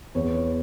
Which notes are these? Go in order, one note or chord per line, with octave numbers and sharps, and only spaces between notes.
E2 C#5